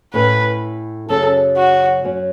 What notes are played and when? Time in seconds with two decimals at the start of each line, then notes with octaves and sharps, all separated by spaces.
0.14 A2 A3 C#4 E4 B4
1.09 F#2 C#3 F#3 C#4 A4
1.57 F#4
2.04 F#2 F#3 C#4